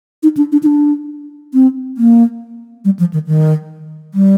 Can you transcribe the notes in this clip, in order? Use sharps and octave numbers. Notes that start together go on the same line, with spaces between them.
D#4
D4
D4
D#4
D4
C4
A#3
G3
F3
D#3
D#3
G3